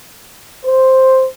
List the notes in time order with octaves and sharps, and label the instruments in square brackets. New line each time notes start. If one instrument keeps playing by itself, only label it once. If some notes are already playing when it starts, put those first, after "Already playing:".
[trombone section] C5